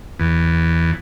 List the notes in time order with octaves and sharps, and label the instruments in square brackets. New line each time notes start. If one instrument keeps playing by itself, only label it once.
[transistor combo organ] E2